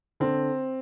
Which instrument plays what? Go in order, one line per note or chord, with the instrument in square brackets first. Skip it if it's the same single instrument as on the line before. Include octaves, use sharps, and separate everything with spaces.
[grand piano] D3 [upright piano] C4